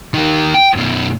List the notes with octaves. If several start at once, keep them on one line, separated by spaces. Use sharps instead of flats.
D#3 A#3
G5
F#2 B2